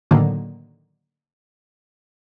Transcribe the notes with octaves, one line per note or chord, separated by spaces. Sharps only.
A2 D3 D#3 F#3 A#3